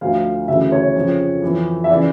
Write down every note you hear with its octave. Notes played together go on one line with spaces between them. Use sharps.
D2 D3 F3 F5
D2 C#3 E3 E5
C#5
F2 C#3 F3
F2 E3
E5
C#3 E3 D5